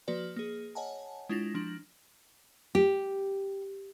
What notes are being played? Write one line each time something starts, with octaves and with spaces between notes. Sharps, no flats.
F3 A#3 F#4 B4 D5
A#3 G#4
C#5 D#5 F#5 G#5 A5
G#3 D4 E4 F4 A6 A#6
F3 D4 A#6 F#7
G4